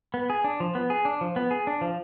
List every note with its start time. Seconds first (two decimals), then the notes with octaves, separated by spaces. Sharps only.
0.14 B3
0.30 G#4
0.44 D4
0.60 F3
0.75 B3
0.90 G#4
1.05 D4
1.21 F3
1.36 B3
1.51 G#4
1.67 D4
1.81 F3